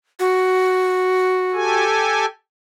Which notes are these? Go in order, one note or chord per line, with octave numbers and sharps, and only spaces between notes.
F#4
G4 A4 G#5